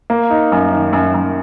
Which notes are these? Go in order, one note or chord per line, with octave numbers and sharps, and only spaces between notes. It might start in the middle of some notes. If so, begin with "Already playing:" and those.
A#3
D#4
F#2
D#3
F#2
F#2